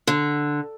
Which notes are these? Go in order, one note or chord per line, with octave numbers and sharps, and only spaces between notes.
D3